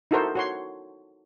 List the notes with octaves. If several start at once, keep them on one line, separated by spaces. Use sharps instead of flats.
D#4 E4 F#4 A4 A#4 C5
F#4 C#5 C6